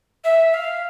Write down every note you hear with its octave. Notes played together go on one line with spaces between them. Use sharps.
E5
F5